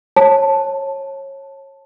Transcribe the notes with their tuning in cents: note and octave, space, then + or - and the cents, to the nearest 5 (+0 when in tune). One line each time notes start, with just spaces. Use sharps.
C#5 -25 A5 +0